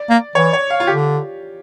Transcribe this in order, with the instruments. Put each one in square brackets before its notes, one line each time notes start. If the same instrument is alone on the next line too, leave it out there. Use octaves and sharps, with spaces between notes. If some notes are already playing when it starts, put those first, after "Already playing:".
Already playing: [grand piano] D5
[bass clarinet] A#3
[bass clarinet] E3 [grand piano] C#5
[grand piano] C#5
F5
F4
[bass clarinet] D3 [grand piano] G4